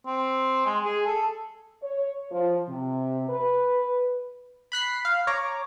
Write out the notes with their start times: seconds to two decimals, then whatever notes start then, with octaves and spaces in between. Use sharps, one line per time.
0.07 C4
0.66 G#3
0.85 G#4
1.06 A4
1.83 C#5
2.31 F3
2.69 C3
3.29 B4
4.72 B5 F#6 B6 C7
5.05 F5
5.27 C#5 A#5 D6